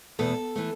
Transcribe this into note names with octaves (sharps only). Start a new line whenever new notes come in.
E2 B2 A3 A4
E3 A3